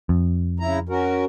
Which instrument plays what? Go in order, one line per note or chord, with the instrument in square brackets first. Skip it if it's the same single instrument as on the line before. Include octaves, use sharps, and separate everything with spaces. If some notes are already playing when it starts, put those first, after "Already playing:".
[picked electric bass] F2
[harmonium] C#3 E4 A#5
C#4 F#4 A#4